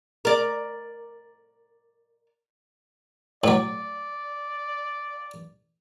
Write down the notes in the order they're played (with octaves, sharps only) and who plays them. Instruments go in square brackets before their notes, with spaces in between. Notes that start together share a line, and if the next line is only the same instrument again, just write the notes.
[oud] A#4 D5
[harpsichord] A2 F#3 [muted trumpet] D5